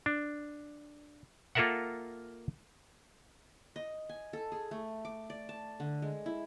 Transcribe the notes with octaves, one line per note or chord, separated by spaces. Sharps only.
D4
A#3 F4 A4 A#4 E5 F#5
D#5
G#5
A4
G#4
A3
D6
D5
A5
D3
G#3
E4